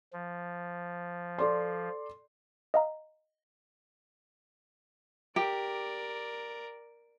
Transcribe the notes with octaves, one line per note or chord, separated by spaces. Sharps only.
F3
A4 D5 C6
D#5 F5 A#5
G4 A#4 D5